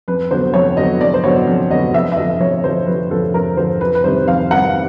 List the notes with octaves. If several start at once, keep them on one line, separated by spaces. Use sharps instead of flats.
F2 B4
D3 F#3 B3 C5
F2 C#5
D3 F#3 B3 D#5
F2 D5
C5
D3 F#3 B3 C#5
F2
D3 F#3 B3 D#5
F2 E5
E5
D3 F3 D#5
F2 C#5
D3 F3 C5
F2 B4
D3 F3 A4
F2 A#4
D3 F3 C5
F2 B4
B4
C3 D#3 G3 C5
F2 F5
C3 D#3 G3 F#5